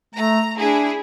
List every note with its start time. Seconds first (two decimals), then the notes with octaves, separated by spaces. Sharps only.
0.14 A3 A#5
0.57 D4 E4 G#4